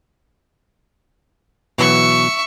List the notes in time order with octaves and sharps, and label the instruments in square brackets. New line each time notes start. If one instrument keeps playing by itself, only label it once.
[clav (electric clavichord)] B2 E3 F#3 [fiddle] E5 C#6